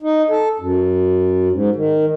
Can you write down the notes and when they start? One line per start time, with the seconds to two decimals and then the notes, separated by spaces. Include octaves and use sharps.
0.03 D#4
0.30 A4
0.60 F#2
1.52 G#2
1.76 D#3